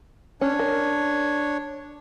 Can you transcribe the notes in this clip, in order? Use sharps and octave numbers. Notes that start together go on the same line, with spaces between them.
C#4 D4 C#5
A#4